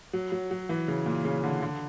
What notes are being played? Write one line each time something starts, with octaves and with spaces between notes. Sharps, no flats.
F#3
F#3
F#3
E3
C#3
A#2
C#3
D3
D3